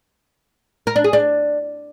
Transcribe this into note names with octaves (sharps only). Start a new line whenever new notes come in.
A#4
D4
G#4
D4